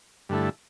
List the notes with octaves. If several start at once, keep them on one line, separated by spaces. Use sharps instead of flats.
G2 D3 A3 E4